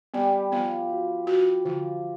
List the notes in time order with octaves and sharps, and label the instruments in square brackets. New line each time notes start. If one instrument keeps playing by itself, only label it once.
[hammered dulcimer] G3 G4 [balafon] B3
[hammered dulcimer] F3 F4 [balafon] B3
[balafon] F#4
F#4
[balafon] D3 [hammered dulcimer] F3 F4